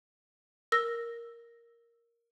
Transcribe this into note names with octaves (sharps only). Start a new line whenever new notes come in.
A#4 E6 A#6